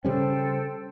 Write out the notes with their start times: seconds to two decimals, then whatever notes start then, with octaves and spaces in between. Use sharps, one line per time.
0.05 C#3 G3 C#4 A4 C5 G5